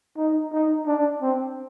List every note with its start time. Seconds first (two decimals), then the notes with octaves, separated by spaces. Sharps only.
0.17 D#4
0.53 D#4
0.87 D4
1.22 C4